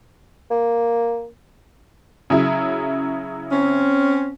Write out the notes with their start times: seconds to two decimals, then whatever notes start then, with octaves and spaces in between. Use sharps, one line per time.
0.50 A#3
2.30 C#3 F#3 E4
3.49 C4 C#4